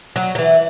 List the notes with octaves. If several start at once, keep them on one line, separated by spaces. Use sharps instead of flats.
F#3
F#3
E3